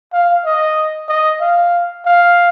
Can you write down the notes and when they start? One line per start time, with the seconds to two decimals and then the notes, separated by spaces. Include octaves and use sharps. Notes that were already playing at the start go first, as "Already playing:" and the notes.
0.13 F5
0.45 D#5
1.09 D#5
1.41 F5
2.05 F5